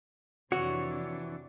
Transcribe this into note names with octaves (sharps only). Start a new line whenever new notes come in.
F2 C3 E3 D4 F#4 C#5